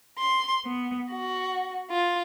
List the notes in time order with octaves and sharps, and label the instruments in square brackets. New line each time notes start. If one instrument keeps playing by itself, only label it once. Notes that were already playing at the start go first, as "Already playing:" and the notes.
[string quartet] C6
B3
F#4
F4